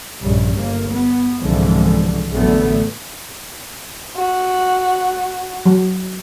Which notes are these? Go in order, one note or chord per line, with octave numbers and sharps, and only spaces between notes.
A#1 G2 C#3 G3
G1 A#3
B3
C2 G#2 B2 D3 E3 F3
A1 E2 D3 F#3 A3 B3
F#4
F#3